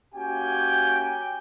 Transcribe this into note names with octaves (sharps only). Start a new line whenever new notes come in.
A#3 C#4 F#4 G4 G5 G#5